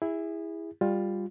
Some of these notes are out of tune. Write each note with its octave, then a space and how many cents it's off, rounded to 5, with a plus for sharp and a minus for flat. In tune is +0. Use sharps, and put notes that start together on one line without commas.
E4 +0 G#4 -30
G3 +15 F4 +15